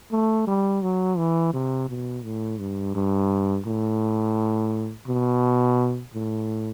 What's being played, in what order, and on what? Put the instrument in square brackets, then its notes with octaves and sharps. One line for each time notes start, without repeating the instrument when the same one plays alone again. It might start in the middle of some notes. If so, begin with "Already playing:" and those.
[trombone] A3
G3
F#3
E3
C3
B2
A2
G2
G2
A2
B2
A2